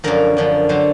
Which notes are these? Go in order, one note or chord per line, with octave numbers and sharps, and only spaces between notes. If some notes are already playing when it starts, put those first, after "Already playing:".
F#2 D3 F3 A#4
F#2 D3 F3
D3 F#3 C5